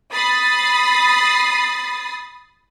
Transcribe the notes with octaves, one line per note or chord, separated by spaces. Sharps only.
B5 D#6 A6 C7